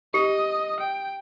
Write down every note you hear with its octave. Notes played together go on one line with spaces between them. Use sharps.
G4 D#5
G5